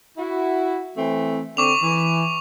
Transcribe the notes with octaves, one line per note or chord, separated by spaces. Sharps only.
E4 F#4
E3 A3 C4
D3 C4 C#6 D6 F7
E3